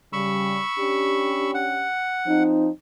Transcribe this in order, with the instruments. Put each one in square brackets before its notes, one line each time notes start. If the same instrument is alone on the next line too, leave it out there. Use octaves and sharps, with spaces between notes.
[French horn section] C#3 G3 [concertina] B5 C#6 E6
[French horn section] C#4 D4 G4
[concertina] F#5
[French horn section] F3 C4 D#4